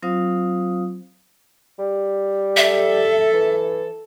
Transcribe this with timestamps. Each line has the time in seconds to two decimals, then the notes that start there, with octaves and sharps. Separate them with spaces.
0.03 F#3 C4 F4 C5 F5 D#6
1.79 G3
2.57 A4 E5
3.34 E3